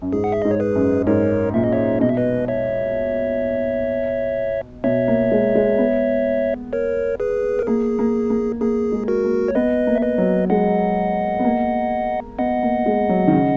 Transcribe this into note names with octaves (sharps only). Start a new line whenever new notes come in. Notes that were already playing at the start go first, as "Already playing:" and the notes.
F#2
G#2 G#4
F#5
E5
G#2 D#5
C#5
G#4 B4
F#2
G#2 A#4 C#5
A#2 E5
D#5
C#5 E5
B2 D#5
E5
B4 D#5
C#5 E5
B2 C#5 E5
A#3
G#3
G#3
B3
A#4 C#5
G#4 B4
A#4
A#3 G#4
A#3
A#3
A#3 G#4
G#3
F#4 A#4
A#3
C#5
B3 B4 D#5
A#3
E5
B4 D#5
F#3
G#3 D#5 F#5
B3
A#3
B3 D#5 F#5
A#3
G#3
F#3
D#3
C#3